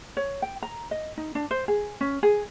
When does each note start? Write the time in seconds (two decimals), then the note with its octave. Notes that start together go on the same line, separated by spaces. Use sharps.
0.17 C#5
0.42 G5
0.62 A#5
0.91 D#5
1.18 D#4
1.35 D4
1.51 C5
1.68 G#4
2.01 C#4
2.23 G#4